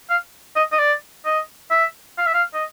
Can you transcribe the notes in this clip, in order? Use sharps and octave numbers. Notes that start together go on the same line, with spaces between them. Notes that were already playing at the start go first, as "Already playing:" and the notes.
F5
D#5
D#5
D5
D#5
E5
F5
E5
F5
D#5